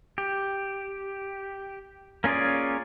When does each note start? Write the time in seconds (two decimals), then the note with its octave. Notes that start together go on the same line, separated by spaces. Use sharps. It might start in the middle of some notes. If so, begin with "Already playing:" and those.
0.18 G4
2.24 A#3 C#4 F4 G#4 D5